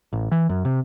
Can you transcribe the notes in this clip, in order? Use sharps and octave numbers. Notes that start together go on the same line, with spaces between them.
A1
E3
F#2
C3